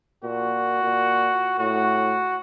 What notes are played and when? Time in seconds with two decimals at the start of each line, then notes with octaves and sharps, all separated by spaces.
0.24 A#2 F#4
0.83 A#2
1.58 A2 F#4